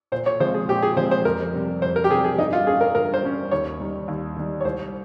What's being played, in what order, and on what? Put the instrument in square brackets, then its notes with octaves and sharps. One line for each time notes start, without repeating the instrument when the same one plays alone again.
[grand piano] A#2 [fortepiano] C5
[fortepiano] C#5
[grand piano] F3 G#3 C4 [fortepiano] C5
[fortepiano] G#4
[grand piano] A#2 [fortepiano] G4
[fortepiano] G#4
[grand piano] F3 G#3 C4 [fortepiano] C5
[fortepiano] C5
[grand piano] F2 [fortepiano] A#4
[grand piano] C3 G3
[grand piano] F2 [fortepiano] C5
[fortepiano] A#4
G4
[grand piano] C3 G3 [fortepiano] G#4
[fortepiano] G#4
[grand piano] G2 [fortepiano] D#4
[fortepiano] F4
[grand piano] G3 C#4 [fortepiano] G#4
[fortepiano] A#4
[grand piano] G2 [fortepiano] A#4
[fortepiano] C5
[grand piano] G3 C#4
[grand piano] D#2 [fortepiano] C#5
[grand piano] D#3 G3
D#2
D#3 G3
[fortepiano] C#5
[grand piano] C2 [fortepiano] C5